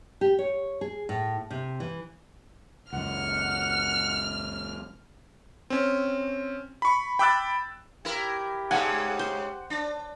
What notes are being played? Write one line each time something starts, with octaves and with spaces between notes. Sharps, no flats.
G4
C#5
G#4
A2
C3
E3
C#2 F#2 F#5 F6
C4 C#4
B5 C#6
G5 B5 D6 E6 F#6 A6
E4 G4 A#4
G#2 C#3 G#3 F#5 G#5
C5
D4